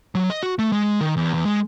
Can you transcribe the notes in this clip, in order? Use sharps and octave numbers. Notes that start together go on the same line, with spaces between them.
F#3
D#5
F#4
A3
G#3
D#3
E2
E2
G#3